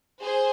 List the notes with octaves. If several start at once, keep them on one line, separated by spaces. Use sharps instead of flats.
G#4 C5